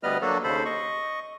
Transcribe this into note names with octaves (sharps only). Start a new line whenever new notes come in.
D2 G3 B3 B4 D#5 F6
F#3 A#3 D4 F#4 A4
D#2 C#3 A4 C5 B5
D#5 C#6